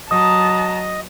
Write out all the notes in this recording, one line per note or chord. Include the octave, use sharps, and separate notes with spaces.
F#3 D#5 A5 A#5 D#6